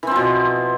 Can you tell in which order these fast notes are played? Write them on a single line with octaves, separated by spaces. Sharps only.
E3 C4 F3 B2